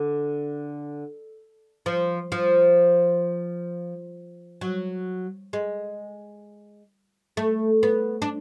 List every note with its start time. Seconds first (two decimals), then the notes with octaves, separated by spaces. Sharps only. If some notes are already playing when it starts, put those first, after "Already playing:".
Already playing: D3
1.86 F3
2.32 F3
4.61 F#3
5.53 G#3
7.37 A3
7.83 B3
8.22 D4